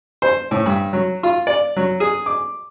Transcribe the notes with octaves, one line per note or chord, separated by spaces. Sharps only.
C5
A2
G2
F#3
F4
D5
F#3
G#4
D6